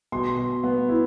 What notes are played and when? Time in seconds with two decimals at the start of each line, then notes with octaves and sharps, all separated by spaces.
0.12 B2 C6
0.37 B2
0.63 B3
0.89 E4